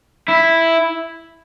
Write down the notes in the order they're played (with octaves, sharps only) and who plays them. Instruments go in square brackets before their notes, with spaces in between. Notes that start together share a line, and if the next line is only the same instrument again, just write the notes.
[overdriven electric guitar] E4